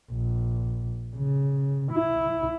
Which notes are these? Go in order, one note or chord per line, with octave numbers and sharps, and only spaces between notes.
A#1
C#3
E4